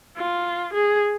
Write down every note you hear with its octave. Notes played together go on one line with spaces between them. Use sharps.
F4
G#4